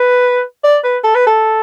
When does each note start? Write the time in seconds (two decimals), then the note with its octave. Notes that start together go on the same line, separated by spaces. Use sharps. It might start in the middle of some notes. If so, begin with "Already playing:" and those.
Already playing: B4
0.64 D5
0.84 B4
1.04 A4
1.15 B4
1.27 A4